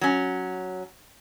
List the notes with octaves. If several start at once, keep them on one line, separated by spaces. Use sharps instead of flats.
F#3 C#4